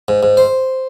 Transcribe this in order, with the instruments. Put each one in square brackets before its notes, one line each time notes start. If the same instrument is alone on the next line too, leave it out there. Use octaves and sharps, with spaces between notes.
[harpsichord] G#2
G#2
C5